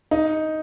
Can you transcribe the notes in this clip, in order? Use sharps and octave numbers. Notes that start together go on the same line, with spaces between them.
D#4